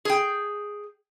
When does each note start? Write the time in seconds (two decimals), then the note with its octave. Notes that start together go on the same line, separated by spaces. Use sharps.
0.05 G#4 G5